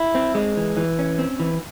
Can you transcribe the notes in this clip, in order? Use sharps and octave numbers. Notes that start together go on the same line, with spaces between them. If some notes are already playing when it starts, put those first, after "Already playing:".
Already playing: E4
C4
G#3
E3
E3
C#4
C4
E3